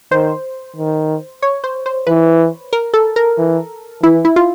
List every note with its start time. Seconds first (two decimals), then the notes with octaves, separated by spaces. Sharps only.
0.11 D#3 C5
0.76 D#3
1.42 C#5
1.64 C5
1.86 C5
2.07 E3 B4
2.73 A#4
2.94 A4
3.16 A#4
3.38 E3
4.02 E3 E4
4.25 E4
4.36 F4